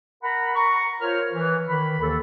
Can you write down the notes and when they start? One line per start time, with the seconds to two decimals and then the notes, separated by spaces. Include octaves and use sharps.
0.22 A#4 F#5 A#5 B5
0.54 A#5 C#6
1.00 F4 A#4 C5 C#5 F6
1.30 E3
1.68 D#3 B5
2.00 D#2 E3 A4